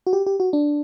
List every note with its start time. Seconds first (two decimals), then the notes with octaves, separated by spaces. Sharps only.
0.07 F#4
0.13 G4
0.26 G4
0.40 F#4
0.53 D4